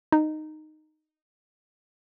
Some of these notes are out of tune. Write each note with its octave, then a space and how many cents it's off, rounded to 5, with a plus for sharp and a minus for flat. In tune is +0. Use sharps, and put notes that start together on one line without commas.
D#4 -10